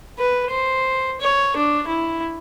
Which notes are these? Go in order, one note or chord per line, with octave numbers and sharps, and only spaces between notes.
B4
C5
C#5
D4
E4